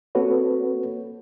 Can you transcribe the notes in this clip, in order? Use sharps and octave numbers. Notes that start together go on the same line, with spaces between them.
A#3 C4 F#4 A4 B4 C#5